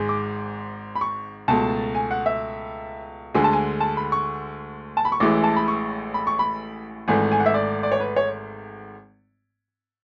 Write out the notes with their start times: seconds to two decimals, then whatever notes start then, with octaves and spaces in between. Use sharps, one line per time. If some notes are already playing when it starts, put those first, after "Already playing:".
Already playing: G#1 G#2 G#3
0.09 D6
0.95 B5
1.01 C#6
1.48 C#2 B2 A3 A5
1.95 G#5
2.11 F#5
2.26 E5
3.34 D2 D3 G#3 G#5
3.44 A5
3.53 G#5
3.81 A5
3.97 B5
4.12 C#6
4.97 A5
5.05 B5
5.12 C#6
5.20 A1 A2 E3 G#3 D6
5.44 A5
5.56 B5
5.68 C#6
6.14 B5
6.27 C#6
6.39 B5
7.08 G#1 G#2 E3 A3 G#5
7.32 G#5
7.40 F#5
7.46 E5
7.54 D5
7.83 D5
7.92 C#5
8.00 B4
8.16 C#5